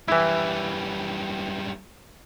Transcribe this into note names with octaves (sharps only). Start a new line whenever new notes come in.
F#2 E3 G3 E4